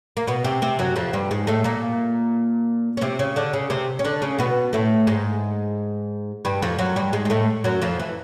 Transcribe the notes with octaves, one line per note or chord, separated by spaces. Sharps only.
A#3
B2 B3
C3 C4
C3 C4
F#2 F#3
F2 F3
G2 G3
G#2 G#3
A2 A3
A#2 A#3
C#4
C3 C4
C#3 C#4
D3 D4
C#3 C#4
C3 C4
C#4
D3 D4
C#3 C#4
B2 B3
A2 A3
G#2 G#3
G2 G3
F2 F3
F#2 F#3
G2 G3
G#2 G#3
G#3
A2 A3
F#2 F#3
F2 F3
E3